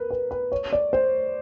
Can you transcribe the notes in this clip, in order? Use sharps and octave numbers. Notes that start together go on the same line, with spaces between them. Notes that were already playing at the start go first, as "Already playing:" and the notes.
Already playing: A#4 B4
B4
B4
C#5
D5
C5